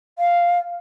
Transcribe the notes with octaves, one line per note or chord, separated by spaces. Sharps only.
F5